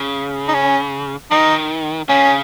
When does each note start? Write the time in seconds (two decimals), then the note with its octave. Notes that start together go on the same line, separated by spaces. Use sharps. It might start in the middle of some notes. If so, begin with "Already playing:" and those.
Already playing: C#3
0.48 D#4
0.54 C#4
1.31 D#3 D#4
2.09 C#3 C#4